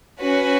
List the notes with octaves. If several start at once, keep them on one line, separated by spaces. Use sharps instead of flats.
C#4 F#4 B4